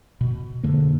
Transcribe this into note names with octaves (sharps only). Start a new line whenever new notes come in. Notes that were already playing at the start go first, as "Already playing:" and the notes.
B2
F2 D3 A#3